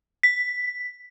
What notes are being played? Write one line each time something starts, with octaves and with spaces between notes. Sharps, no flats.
B6